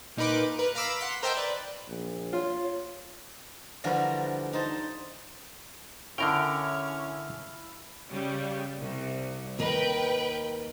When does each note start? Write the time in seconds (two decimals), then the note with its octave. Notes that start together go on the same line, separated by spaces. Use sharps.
0.17 A#2 D#4 A#4 B4 D6
0.59 A#4 B4
0.75 F5 A#5 B5 D6 E6
0.99 F#5 C6 B6
1.23 A#4 C5 D#5 E5 G5 A5
1.37 B4 D5
1.88 A#1
2.33 F4 C#5
3.84 D3 E3 F3 G3 F#4 A#4
4.53 D#4 C5 A5
6.18 D3 C#4 E4 A#4 F5 G5 F6 F7
8.09 C#3 G3
8.78 C2
9.59 D#2 A#4 B4 D#5 G5